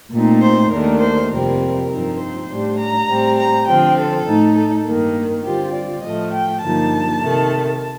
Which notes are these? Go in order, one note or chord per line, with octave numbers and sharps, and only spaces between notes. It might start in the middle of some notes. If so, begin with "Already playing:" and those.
A#2 A3 C4 D#4
C5
D#2 D#3 A3 D4 A#4
C5
F2 C3 G3 C4 A#4
A#4
G2 F3 C4 D#4
C5
A2 G3 D4
A#5
A2 G3 C4
A#5
D3 F3 C4 G5
A4
A2 A3 D#4
A4
G2 D#3 A#3
D3 G3 C4 F4 G4
D5
A2 F3 A3 D#5
G5
G2 D3 F3 A#3 D#4 A5
C3 D#3 A3